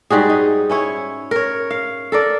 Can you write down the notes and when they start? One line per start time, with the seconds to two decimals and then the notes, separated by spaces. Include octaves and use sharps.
0.10 G#2 G3 F#4 G#4
0.29 D#4
0.70 C#4 E4 C#5
1.31 A#4 C#5
1.71 F5
2.12 A4 A#4 D5